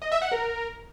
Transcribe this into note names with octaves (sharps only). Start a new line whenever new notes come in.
D#5
E5
F#5
A#4